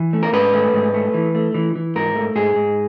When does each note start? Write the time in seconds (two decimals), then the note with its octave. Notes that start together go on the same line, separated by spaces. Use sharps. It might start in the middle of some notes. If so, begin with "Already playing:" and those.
Already playing: E3
0.13 A3
0.23 A#4
0.33 G#2 B4
0.54 A3
0.74 G#2
0.94 A3
1.14 E3
1.35 A3
1.54 E3
1.76 E3
1.95 G#2 A#4
2.16 A3
2.36 G#2 G#4
2.56 G#2